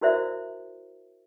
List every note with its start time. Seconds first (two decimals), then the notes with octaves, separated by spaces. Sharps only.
0.01 E4 F#4 A#4 C5 D5 E5